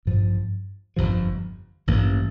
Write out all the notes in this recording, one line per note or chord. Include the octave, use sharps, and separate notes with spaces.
A1 G2 F3
G1 F2 C3 F3
A1 G2 E3 A#3